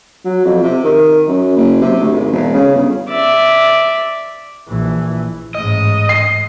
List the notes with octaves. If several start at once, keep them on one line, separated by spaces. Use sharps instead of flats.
F#3
F2
C3
D#3
F#2
F#1
C3
D2
G#1
E1
C#3
G1
D5 E5
A#1 E3
A1 G#2 D#5
C7